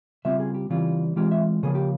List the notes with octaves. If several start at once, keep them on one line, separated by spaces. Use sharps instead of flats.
C#3 G3 C4 F4 E5
G#4
G4
C#3 E3 G3 C4 F4
E3 G#3 C4 F4 G4
E5
C#3 F3 A#3 G#4
G4